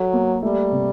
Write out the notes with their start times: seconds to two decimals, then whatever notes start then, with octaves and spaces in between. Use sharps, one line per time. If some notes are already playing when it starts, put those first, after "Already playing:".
Already playing: F#3 A4
0.13 A#3
0.43 G3 A3
0.72 C3